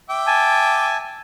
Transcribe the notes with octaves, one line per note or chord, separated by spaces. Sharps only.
E5 G5 D6
G#5 A5